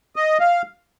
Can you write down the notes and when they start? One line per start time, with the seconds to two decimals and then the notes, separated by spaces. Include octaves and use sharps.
0.16 D#5
0.40 F5